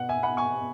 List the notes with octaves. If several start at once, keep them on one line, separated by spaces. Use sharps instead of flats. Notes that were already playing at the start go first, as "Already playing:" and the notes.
Already playing: B2 B3 F#5
E5 G#5
F#5 B5
G#5 C#6